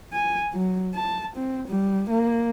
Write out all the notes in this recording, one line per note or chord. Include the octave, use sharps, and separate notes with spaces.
G#5
F#3
A5
C4
G3
A#3